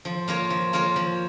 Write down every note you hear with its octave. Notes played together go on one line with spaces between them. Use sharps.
F3
A#3 F4 A#4 C#5
F3
A#3 F4 A#4 C#5
F3